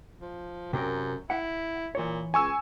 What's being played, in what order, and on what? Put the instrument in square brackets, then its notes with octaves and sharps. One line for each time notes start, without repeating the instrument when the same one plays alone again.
[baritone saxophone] F3
[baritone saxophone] F#2 [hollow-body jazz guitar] C3 C4 A#4
[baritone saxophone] E4 [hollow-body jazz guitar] F#5
[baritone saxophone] A#2 [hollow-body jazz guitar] E3 C#5
[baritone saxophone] C#2 [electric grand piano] G#5 C#6 E6